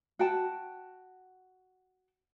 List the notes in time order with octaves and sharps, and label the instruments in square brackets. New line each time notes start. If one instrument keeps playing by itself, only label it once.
[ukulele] F#4 G5 A5